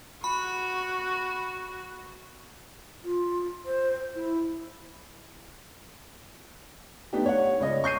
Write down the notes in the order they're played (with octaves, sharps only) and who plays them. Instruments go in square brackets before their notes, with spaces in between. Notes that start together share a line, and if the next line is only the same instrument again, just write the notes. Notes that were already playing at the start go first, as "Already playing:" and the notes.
[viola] F#4 [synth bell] B5
[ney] F4
C5
E4
[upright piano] A3 B3 D4 D#4 G4
C#5 F#5
C#2 C#5 D#5
C#6 G6 C7 D#7